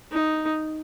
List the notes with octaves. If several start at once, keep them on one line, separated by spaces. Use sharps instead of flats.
D#4